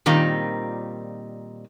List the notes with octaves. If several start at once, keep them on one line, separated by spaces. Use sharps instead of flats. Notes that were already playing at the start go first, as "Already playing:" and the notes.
A#2 D#3 G3 C4 D#4 F4